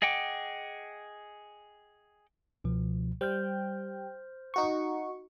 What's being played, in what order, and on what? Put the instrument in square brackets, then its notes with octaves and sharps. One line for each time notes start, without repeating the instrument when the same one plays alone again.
[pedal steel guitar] G#4 D#5 F#5 G5 D6
[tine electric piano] C#2 B2 F3
[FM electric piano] G3 G5 [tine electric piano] C5 F6 G6
[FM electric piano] D#4 F#4 C#6